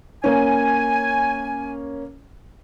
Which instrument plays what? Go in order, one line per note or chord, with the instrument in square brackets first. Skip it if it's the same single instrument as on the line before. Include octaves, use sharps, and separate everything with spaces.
[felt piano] A#3 C#4 [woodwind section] G#5